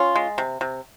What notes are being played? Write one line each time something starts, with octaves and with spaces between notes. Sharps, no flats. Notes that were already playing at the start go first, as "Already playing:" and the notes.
Already playing: C#4 F4
G#3
C3
C3